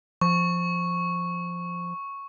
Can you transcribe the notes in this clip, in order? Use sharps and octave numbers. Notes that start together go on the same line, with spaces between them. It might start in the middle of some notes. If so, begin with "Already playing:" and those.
F3 C#6